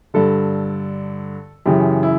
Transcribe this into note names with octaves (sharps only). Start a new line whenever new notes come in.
G2 D3 A4
F#2 C#3 E3 G4
E4